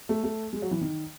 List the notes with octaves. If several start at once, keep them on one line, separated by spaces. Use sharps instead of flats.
A3
A3
G#3
F#3
E3
D#3